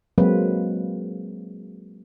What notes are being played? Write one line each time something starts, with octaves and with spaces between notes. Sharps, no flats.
F#3 G#3 A#3 C4 B4